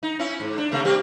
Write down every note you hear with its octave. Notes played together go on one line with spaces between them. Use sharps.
D#4
C#4 E4
G#2
D4
C3 A3 A#3
G3 C4 G4